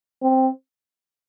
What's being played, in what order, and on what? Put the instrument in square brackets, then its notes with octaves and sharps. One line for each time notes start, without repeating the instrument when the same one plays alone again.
[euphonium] C4